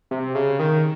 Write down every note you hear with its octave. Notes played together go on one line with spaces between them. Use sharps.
C3
C#3
D#3